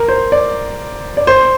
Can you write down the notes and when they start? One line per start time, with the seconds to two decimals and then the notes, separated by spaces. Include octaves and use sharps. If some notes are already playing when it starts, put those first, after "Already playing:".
Already playing: A#4
0.08 C5
0.32 D5
1.17 D5
1.27 C5